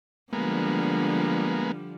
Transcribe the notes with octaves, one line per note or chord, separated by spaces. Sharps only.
D3 F3 G3 G#3 A#3 B3